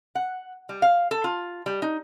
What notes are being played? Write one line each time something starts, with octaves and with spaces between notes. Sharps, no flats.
F#5
G3
F5
A4
F4
G3
D#4